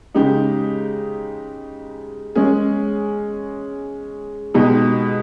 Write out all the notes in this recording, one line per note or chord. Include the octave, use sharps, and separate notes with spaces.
C#3 G#3 D#4 G4
G#3 C#4 G#4
B2 G#3 D#4 G4